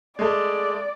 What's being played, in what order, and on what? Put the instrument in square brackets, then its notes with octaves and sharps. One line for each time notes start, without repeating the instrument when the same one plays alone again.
[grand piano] G#3 A3 [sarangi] D5